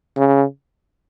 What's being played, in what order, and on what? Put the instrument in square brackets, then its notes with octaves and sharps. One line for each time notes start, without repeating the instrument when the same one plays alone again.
[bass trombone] C#3